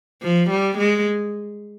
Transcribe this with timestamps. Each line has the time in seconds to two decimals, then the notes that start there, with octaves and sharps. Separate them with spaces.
0.23 F3
0.50 G3
0.78 G#3